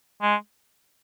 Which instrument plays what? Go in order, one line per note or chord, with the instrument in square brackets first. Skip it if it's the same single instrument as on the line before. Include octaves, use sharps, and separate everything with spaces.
[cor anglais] G#3